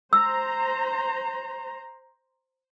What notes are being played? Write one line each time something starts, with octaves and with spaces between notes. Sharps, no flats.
C5 A#5 E6